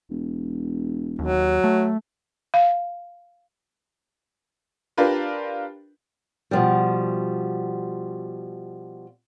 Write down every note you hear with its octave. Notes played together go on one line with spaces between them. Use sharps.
E1
D#2 F#3
A3
F5
D4 F4 G4 A#4 B4
B2 F3 G3